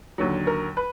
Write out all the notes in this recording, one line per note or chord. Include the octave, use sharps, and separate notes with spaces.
D#2 D3 F#3
A#4
B4